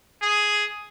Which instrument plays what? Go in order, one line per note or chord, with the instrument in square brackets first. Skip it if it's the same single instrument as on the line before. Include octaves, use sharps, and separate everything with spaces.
[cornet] G#4